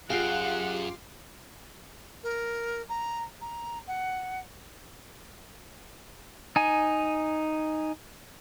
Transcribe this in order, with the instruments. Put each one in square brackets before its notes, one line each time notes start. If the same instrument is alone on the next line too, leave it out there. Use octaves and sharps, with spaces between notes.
[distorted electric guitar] F#2 [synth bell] F4 G4 F5 [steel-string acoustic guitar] G#4 [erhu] F#5
[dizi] A#4
A#5
A#5
F#5
[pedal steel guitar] D#4 G#5